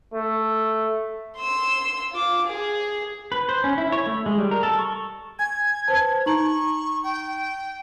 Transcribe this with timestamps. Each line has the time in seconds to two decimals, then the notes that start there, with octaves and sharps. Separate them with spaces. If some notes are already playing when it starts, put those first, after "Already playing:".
0.14 A3
1.37 C6 E6
2.12 F4 D6
2.46 G#4
3.32 B4
3.49 C5
3.64 C#4
3.78 E4
3.92 C#5
4.07 A3
4.26 G#3
4.38 G3
4.51 A#4
4.63 A4
4.79 C#6
5.39 G#5 G#6
5.88 B4 C5 A5
6.26 D#4 A#5 C#6 F#7
7.04 G5